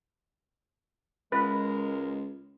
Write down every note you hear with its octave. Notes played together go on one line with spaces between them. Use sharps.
C#2 G#3 A#4 B4